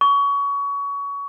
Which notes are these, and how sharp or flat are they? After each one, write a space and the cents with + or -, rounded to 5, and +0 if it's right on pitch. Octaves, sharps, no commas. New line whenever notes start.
C#6 +25